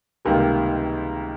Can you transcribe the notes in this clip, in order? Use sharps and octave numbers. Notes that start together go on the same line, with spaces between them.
C#2 C3 D#3 G3 A#3 A#4